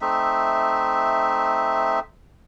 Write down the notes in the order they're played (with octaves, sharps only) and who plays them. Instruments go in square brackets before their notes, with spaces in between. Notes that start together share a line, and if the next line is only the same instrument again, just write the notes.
[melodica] A3 C4 D#4 E5